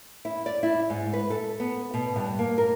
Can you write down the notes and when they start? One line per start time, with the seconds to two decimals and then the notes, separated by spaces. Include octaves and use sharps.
0.25 E4
0.46 D5
0.63 E4
0.90 G#2
1.13 B4
1.30 A4
1.60 B3
1.94 B2
2.16 G2
2.39 A#3
2.58 A#4